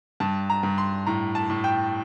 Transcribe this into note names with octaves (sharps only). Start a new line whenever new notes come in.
G2 A5
A#5
G2
C6
A2 A#5
A5
A2
G5